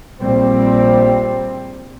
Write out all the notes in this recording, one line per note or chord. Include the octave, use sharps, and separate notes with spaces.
A#1 G3 C4